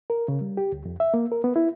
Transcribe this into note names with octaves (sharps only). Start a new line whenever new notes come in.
A#4
C#3
G3
G4
D2
F2
E5
A#3
A#4
B3
E4